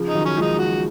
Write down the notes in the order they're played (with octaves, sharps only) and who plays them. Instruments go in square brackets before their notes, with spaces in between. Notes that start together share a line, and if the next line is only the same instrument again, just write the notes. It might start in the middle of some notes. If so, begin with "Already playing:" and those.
Already playing: [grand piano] C#3 F3
[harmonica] D#4
[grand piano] D#3 F#3
[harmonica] C#4
[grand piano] F3 G#3 [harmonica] D#4
[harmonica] F#4